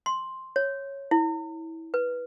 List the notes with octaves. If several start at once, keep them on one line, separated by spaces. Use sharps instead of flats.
C6
C#5
E4
B4